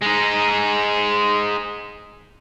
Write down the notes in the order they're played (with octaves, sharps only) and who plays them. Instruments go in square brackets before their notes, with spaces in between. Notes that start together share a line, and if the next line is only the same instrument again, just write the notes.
[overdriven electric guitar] G#3 D#4